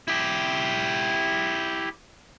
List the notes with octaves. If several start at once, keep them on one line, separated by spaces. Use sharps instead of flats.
E4 G4